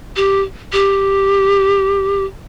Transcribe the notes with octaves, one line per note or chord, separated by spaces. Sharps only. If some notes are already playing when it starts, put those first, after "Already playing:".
G4
G4